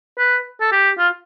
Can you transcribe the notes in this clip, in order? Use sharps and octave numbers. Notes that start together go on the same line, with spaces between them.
B4
A4
G4
F4